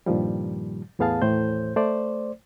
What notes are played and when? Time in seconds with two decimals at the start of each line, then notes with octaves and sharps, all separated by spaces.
0.06 G2 A#2 D#3 F3 G3
0.99 E2 A2 B3 G#4 F5 A5
1.22 D#2 A2 E3 C5 G6
1.76 A3 C5 D5